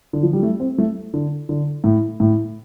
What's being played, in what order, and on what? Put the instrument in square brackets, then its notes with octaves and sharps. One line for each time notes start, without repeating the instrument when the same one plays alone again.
[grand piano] D3
F3
G3
A3
C4
A3
D3
D3
A2
A2